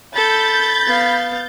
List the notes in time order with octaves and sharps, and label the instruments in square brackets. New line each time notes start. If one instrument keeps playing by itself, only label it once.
[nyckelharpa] A4 [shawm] B5 [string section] G6 A6
[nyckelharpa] B3 F5